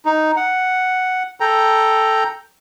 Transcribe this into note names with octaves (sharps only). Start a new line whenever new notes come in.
D#4
F#5
A4 G5 A#5